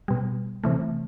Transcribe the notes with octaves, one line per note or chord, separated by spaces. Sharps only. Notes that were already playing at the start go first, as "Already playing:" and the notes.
B2 G3
C3 E3 A3